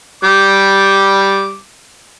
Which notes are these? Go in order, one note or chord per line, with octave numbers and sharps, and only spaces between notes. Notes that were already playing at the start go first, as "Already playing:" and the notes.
G3 D6